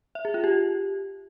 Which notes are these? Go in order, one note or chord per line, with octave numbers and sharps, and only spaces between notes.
E5
G#4
F4
G4